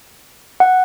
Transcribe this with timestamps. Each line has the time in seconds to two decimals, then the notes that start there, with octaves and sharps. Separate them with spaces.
0.60 F#5